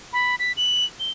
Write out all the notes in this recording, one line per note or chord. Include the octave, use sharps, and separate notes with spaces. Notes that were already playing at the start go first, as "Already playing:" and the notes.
B5
B6
F#7
G7